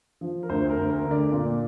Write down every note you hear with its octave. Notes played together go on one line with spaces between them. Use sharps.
F3
A#4
D2 C5
A#4
D2
A#4
D3
D5
A#2